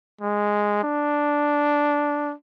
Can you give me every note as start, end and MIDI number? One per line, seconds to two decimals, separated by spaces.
0.21 0.80 56
0.83 2.34 62